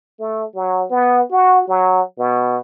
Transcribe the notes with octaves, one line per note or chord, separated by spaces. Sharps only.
A3
F#3
B3
F#4
F#3
B2